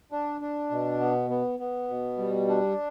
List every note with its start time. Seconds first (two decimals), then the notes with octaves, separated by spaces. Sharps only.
0.12 D4
0.41 D4
0.71 B2
1.00 B3
1.30 B3
1.59 B3
1.89 B2
2.18 G3
2.48 D4